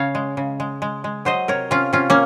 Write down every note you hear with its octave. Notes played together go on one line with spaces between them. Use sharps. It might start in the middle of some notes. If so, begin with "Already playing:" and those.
Already playing: C#3 C#5 F5
G#3
C#3
G#3
G#3
G#3
F#3 C5 D#5
C3 A#4 C#5
C3 C#4 F4
C3 C#4 F4
A#3 C#4